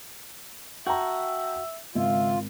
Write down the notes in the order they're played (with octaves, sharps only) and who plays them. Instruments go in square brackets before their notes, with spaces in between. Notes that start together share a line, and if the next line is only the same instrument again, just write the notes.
[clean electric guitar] F#4 [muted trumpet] E5 [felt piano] G5 A5 A#5
[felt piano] G#1 [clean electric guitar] C#2 [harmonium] F4 [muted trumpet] E5